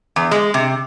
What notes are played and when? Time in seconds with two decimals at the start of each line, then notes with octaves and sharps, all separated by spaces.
0.16 E2
0.31 G#3
0.54 C3